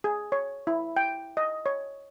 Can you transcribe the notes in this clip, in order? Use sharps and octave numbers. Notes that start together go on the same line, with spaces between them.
G#4
C#5
E4
G5
D#5
C#5